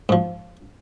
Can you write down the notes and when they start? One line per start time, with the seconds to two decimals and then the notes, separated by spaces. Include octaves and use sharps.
0.09 G#2 F3